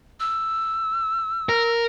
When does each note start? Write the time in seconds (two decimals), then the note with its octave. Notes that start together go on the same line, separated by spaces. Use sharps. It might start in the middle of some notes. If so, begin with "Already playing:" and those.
0.20 E6
1.49 A#4